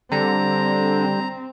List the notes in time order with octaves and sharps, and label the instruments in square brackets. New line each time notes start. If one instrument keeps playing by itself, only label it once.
[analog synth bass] D3 [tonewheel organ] G3 [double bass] C4 [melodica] A#5